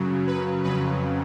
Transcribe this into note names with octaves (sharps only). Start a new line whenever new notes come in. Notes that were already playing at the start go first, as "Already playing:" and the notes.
Already playing: F#2 C#3 F#3
B4
F2 C#3 F#3 B4